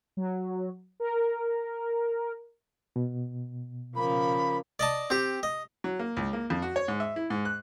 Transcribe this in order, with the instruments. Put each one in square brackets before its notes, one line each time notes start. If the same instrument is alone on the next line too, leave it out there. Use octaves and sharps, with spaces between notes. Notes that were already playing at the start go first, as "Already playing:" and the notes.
[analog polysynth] F#3
A#4
[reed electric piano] B2
[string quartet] C#3 F3 A#3 [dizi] B5
[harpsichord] D5 D#5 A5
C4 G4
D#5
[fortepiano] F#3
A#3
C#2
A#3
F2
F#4
C#5
G#2
E5
E4
G#2
F#6